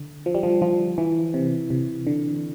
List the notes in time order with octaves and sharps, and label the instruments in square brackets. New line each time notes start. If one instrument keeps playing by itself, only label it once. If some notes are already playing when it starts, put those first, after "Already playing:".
Already playing: [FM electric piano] D3
F3
G3
F3
F3
E3
C3
C3
D3